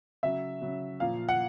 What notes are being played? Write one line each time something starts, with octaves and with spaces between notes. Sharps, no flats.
C#3 F#3 E5
C#3 F#3
A#2 F3 F5
F#5